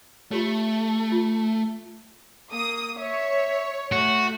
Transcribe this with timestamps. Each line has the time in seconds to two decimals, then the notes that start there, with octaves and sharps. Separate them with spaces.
0.31 A3 F4 G4 C#5
1.12 F4
2.53 A#3 D#6
2.99 C#5 E5
3.92 A3 F#4